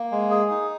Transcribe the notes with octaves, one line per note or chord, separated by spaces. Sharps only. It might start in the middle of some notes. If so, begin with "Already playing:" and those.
Already playing: A#3
G#3
G#4
D#4